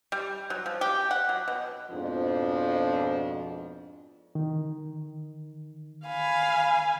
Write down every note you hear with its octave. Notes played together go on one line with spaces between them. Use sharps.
G3
F#3
F3
G4
F#5
F#3
B2
F2 G#2 B2 F3 D4
D#3
F5 G#5 B5